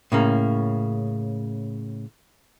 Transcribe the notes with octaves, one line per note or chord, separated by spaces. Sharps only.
A2 C#3 A#3